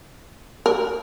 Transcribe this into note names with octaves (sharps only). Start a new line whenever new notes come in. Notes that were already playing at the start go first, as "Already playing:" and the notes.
A#4